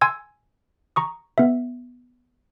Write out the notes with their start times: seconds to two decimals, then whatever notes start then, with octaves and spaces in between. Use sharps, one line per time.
0.01 G#5 C6 E6 G#6
0.96 A#5 C#6 D#6
1.38 B3 E5